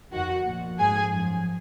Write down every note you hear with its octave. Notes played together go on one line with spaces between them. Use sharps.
F2 D#3 F#4 F#5
A#2 F3
G#2 F3 G#4 G#5
F#2 F3